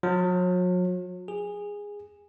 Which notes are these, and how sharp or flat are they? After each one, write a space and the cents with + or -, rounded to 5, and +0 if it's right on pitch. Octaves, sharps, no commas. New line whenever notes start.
F#3 -40
G#4 -15